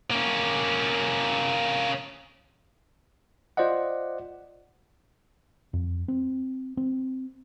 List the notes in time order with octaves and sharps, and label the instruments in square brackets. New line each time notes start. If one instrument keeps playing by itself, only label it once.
[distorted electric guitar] A#3 C#4
[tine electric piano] F4 C5 D5 D#5 F#5
[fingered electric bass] F2
C4
C4